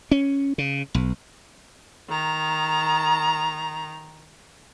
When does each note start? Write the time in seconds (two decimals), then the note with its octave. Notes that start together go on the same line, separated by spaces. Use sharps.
0.11 C#4
0.58 C#3
0.94 B1
2.10 D#3 A#5